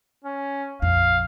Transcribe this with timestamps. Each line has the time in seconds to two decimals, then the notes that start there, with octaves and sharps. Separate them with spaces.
0.24 C#4
0.82 A#1 F2 F5